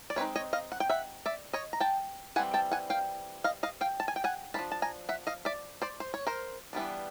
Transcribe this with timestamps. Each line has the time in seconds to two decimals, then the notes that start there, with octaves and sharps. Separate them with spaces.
0.10 D5
0.16 G#3 C4 D#4 B4 C#5
0.36 C#5 D#5
0.53 D#5 F5
0.72 F#5
0.80 G5
0.89 E5 F#5
1.26 D5 E5
1.53 C#5 D#5
1.73 A#5
1.80 G5 A5
2.36 E3 G3 C4 F#5 G#5
2.54 G5 A5
2.71 F#5 G#5
2.90 F5 G5
3.44 D#5 F5
3.63 D#5 F5
3.81 F5 G5
4.00 A5
4.08 G#5
4.16 G5
4.24 F#5 G#5
4.54 A#3 D4 A5 B5
4.59 F3
4.72 A5
4.82 G#5 A#5
5.09 E5 F#5
5.27 D#5 F5
5.45 D5 E5
5.82 C5 D5
6.00 C5
6.14 C#5
6.27 A#4 C5
6.73 E3 G3 B3 D4